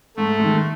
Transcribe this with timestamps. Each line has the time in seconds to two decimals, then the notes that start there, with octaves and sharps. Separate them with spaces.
0.17 G#2 A3
0.39 D#3 G#3